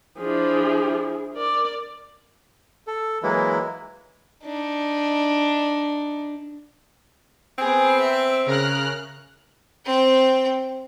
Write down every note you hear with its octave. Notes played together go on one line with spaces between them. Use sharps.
F3 D4 E4 G#4
A#4 D5
A4
E3 F#3 G#3 A#3 E4
D4 D#4
B3 C4 G#4
E5
C#3 A#4 F6 F#6
C4 G5